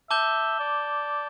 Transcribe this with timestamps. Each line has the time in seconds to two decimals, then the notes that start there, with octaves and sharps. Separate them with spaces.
0.10 E5 A5 D6 G6 E7 G7
0.60 D5